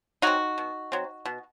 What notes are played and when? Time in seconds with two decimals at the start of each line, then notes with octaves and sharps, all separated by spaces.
0.22 F#3 C4 D#4 F#4
0.58 B2
0.92 F#3 C4
1.25 B2